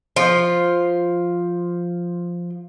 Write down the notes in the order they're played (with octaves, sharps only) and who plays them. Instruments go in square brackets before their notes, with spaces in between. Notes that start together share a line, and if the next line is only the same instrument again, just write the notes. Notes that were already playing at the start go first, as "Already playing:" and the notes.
[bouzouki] F3 F4